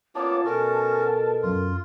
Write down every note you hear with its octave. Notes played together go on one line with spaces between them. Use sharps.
A#3 B3 C#4 F4 C#5 D5 A5
B2 C#4 F#4 A4 A#4
F#2 F4